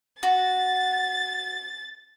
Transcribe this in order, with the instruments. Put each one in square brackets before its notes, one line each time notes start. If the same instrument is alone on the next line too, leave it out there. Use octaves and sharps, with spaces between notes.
[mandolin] F#4 [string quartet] A6